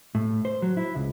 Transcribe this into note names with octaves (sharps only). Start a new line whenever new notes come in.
A2
C5
F#3
E4
C#2